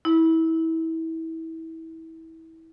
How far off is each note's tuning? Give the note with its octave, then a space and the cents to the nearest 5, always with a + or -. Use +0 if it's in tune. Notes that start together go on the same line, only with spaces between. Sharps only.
E4 -25